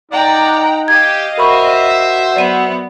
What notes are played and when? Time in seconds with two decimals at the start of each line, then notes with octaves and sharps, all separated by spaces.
0.12 D#4 D5 F#5 G5 A#5
0.88 G4 D#5 F5 G#6
1.38 F#4 A#4 C5 E5 B5 C#6
2.36 F#3 B3 D5 D#7